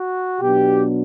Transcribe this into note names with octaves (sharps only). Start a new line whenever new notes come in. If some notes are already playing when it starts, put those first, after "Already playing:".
Already playing: F#4
B2 F#3 B3 D4 G4